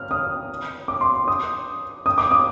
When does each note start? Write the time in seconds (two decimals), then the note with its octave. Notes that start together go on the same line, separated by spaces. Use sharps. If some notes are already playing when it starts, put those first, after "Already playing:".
Already playing: F6
0.11 D#6
0.88 D6
1.01 C6
1.28 D#6
2.06 D#6
2.18 D6
2.31 D#6